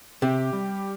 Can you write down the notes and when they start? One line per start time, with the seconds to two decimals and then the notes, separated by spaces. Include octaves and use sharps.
0.22 C3 G4
0.53 G3